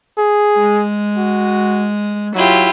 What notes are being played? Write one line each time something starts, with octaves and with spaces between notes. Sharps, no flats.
G#4
G#3
F#4
F#3 E4 F4 G4